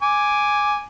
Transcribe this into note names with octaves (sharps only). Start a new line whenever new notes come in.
G#5 D6